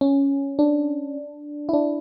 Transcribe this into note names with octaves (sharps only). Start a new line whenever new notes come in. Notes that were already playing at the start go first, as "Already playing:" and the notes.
C#4
D4
E4
D4